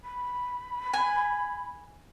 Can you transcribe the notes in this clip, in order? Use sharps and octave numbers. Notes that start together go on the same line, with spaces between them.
B5
G#5